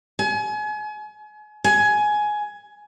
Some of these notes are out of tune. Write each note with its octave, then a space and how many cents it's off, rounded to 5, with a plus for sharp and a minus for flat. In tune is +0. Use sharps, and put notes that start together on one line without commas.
G#5 +35
G#5 +15